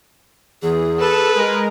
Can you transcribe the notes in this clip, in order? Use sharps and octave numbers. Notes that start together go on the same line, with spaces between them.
E2 G#4
A4 B4 E7
G#3 A#4